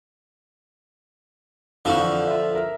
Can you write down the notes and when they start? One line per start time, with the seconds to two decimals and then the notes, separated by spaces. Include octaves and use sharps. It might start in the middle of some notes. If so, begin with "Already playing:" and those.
1.85 F2 D3 E3 F3 C#6
2.27 F4 E5
2.55 A#4 E5